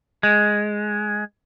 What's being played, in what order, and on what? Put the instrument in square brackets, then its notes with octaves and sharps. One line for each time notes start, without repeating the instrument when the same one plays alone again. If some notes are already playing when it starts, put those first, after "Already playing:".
[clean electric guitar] G#3